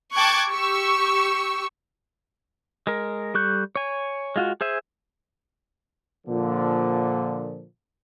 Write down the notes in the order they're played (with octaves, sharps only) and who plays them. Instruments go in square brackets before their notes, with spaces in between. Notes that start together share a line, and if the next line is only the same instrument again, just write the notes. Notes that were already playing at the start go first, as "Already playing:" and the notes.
[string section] G5 A5 C#6 D6 F#6 G#6
G4 C#6 E6
[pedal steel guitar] G#3 A#4
G3 A4 C#6 F#6 G6
C#5 G#5
G#3 F4 F#4
G#4 C5 E5 G#5
[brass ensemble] A#2 D3 F3